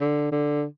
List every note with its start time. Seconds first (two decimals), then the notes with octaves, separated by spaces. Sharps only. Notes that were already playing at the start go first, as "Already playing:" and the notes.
0.01 D3
0.32 D3